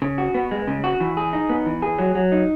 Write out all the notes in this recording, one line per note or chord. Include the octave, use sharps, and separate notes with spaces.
C#3
F#4
B3
G#3
C#3
F#4
E3
G#4
D#4
B3
E3
G#4
F#3
F#3
D#4